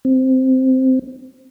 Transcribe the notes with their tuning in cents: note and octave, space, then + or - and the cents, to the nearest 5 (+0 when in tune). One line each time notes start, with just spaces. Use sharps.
C4 -5